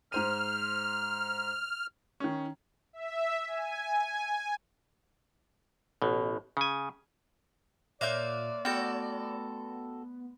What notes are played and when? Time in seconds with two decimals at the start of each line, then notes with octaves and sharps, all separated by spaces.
0.12 G#2 C5 F6 D#7
2.20 D#3 C#4
2.93 E5
3.47 G#5
6.02 A1 B2
6.57 C#3 G#5
8.01 A#2 A#3 C#5 D5 E5 C6 G6
8.65 A3 B3 F#4 A4 G5 B5